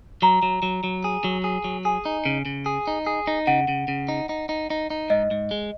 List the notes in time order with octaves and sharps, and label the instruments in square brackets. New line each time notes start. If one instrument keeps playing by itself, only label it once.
[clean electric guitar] F#3 [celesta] A#5
[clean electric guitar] F#3
F#3
F#3
G#4
F#3
G#4
F#3
[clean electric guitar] G#4 [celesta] G#5
[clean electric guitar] D#4
C#3
C#3
G#4
D#4
G#4
D#4
[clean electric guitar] C#3 [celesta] F#5
[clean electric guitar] C#3
C#3
D#4
D#4
D#4
D#4
D#4
[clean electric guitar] G#2 [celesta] D#5
[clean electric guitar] G#2
G#3